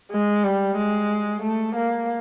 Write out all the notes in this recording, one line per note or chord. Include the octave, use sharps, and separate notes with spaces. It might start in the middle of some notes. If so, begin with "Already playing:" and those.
G#3
G3
G#3
A3
A#3